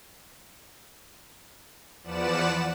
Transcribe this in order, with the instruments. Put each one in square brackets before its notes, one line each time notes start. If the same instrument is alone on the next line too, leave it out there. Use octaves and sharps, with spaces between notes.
[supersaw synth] E2 F3 B4 D5 F#5 E7